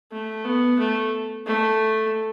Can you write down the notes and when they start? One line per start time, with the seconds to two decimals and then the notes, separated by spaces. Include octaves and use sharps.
0.12 A3
0.45 B3
0.79 A3
1.47 A3